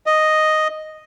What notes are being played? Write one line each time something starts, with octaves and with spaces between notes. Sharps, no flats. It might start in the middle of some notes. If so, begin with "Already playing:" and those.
D#5